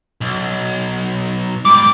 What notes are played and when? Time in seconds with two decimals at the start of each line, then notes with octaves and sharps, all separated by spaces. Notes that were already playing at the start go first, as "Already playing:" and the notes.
0.21 B1
1.65 G#2 G3 D6